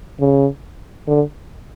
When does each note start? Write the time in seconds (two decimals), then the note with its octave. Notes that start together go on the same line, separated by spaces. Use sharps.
0.20 C#3
1.08 D3